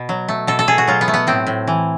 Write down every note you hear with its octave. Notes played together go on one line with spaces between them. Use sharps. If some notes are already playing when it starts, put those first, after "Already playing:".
Already playing: B2
F#3
A3
B2 A4
A4
B2 G#4
F#4
F#3 F4
B3
A3
B3
A2 C4
A2
E3